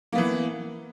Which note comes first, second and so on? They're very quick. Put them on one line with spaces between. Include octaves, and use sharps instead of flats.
A#3 B3 E3